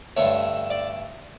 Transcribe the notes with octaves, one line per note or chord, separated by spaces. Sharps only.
G2 D3 A3 C#5
D5